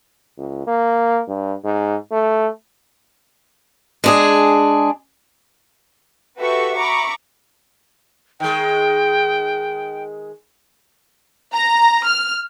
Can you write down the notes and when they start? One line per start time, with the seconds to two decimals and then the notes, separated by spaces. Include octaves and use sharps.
0.38 C#2
0.67 A#3
1.28 G2
1.64 G#2
2.12 A3
4.04 G#3 D4 G#4
6.39 F#4 G4 A4 B4 E5 C#6
6.77 E5 A#5 B5 C#6 D6
8.40 D#3 G#3 G5
11.53 A#5
12.07 F6